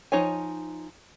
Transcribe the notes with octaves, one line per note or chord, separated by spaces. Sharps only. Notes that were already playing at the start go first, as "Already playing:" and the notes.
F3 D#4 C#5 G#5